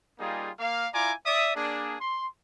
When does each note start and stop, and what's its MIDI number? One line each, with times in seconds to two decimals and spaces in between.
0.20 0.50 55
0.20 0.50 58
0.20 0.50 63
0.20 0.50 65
0.20 0.50 68
0.59 0.87 58
0.59 0.87 77
0.93 1.13 64
0.93 1.13 65
0.93 1.13 74
0.93 1.13 80
0.93 1.13 82
0.93 1.13 86
1.26 1.51 74
1.26 1.51 76
1.26 1.51 87
1.56 1.95 58
1.56 1.95 62
1.56 1.95 68
2.00 2.26 84